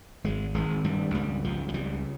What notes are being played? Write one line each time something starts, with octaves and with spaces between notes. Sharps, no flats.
G#1 G#3
G#1 G#3
G2 G3
C#2 G3
C#2 F3
F3
C#3 G3